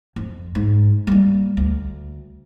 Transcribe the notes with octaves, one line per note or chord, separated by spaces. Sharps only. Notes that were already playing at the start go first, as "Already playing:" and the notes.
F2
G#2
G3 A#3
D2